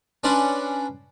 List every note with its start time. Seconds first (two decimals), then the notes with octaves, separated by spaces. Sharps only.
0.24 C#4 D4 B4 D5 F#5 C6